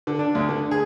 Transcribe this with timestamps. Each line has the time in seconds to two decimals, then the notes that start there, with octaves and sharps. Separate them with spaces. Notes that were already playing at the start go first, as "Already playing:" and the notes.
0.07 D3
0.19 D4
0.35 D2
0.49 D3
0.71 G#4